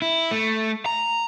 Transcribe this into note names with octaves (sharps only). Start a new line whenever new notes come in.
E4
A3
A#5